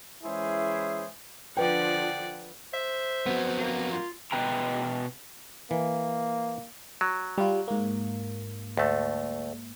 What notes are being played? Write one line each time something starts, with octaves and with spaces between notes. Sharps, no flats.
E3 G#3 C#4 E4 G#4 C5
D3 F3 B4 D5 F#5 G5
C5 E5
F2 F#3 B3
A#3
F4
B2 B4 G5 A#5
E3 A#3
F#3
G3 F4
G#2 A#3
D2 A3